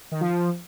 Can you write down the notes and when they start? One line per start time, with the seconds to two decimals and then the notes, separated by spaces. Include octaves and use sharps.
0.12 D#3
0.21 F3